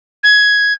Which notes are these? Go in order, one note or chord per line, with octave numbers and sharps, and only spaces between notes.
G#6